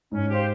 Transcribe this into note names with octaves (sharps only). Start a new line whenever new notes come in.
G#2 C#4
G4 C5 F5